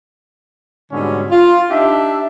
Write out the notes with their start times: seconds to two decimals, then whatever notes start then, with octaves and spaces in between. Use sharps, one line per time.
0.91 G#2 B2 D3 G3 C#4
1.30 F4
1.70 D4 D#4 G4 E5